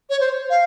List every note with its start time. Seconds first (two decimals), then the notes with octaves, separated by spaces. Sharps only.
0.09 C#5
0.20 C5
0.50 F5